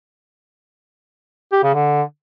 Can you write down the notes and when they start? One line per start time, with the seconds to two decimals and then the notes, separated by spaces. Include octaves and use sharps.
1.52 G4
1.63 C#3
1.74 D3